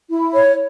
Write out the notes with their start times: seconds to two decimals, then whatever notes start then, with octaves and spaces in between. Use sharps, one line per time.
0.09 E4
0.33 C#5